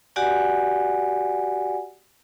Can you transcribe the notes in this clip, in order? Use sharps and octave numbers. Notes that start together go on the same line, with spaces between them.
F#4 G4 D5 F#5 G#5